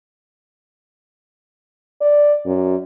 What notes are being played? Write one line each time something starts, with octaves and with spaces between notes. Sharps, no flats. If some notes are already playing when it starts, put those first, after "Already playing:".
D5
F#2